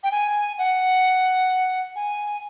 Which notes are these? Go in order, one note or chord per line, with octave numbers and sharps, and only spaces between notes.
G5
G#5
F#5
G#5